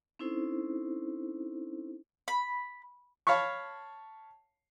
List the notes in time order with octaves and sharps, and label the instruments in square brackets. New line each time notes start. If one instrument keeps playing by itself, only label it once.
[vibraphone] C4 C#4 D#4 E4 A4 C5
[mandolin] B5
[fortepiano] C#5 F5 A5 B5 C#6